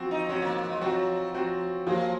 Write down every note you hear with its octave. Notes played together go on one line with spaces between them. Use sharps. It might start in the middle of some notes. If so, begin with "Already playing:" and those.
Already playing: F3 C4 F#4
D#4
F3 C4 C#4 F#4
A#3
A#3
G#3
F3 F#3 C4 F#4
F3 C4 F#4
F3 F#3 A#3 F4 G#4